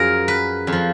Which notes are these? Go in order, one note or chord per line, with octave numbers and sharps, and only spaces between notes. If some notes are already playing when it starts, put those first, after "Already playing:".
Already playing: F#2 F3 F#4 G#4 A#4
B4
F2
F3